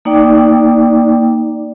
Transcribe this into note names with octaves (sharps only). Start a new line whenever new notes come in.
A#3 D#4 D5 G5 D6